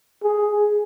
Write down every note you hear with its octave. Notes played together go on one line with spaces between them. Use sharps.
G#4